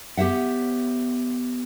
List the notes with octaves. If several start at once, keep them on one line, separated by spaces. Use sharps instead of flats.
B3 G4 C#5 E5 F#5